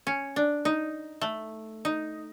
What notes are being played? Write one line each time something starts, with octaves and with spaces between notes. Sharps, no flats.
C#4
D4
D#4
A3
D#4